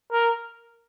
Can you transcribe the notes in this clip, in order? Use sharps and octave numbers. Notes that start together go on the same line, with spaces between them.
A#4